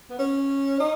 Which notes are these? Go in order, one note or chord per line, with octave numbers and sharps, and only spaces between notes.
B3
C#4
D#4